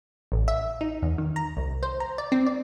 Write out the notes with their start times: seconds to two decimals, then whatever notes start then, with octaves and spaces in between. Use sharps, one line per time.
0.32 A1
0.48 E5
0.81 D#4
1.02 E2
1.18 D#3
1.36 A#5
1.57 C2
1.83 C5
2.00 A#5
2.18 D5
2.32 C4
2.46 D5